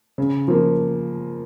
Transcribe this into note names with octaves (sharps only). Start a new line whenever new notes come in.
C#3
F3 A#3